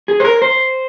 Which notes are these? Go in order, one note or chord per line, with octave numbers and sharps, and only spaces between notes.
G#4
C5
A#4
C5